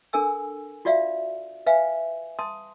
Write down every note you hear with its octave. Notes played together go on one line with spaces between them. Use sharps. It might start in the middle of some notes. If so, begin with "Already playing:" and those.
D4 A4 A#4 G#5 E6
F4 F#4 D5 E5 F5
B4 E5 F5 G#5
A5 C6 D#6